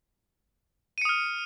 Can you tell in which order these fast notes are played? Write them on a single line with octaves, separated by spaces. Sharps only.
D#7 C#7 D#6 F6